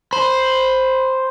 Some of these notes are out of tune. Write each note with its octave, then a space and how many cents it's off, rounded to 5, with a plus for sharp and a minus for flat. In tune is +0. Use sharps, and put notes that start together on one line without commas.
C5 +0 B5 +0